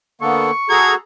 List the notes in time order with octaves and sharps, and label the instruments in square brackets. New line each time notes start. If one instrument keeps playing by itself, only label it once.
[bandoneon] D3 A4 [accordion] A#3 B3 [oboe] C#6
[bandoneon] F#4 [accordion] G#4 A4 A#5 [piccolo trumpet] G#6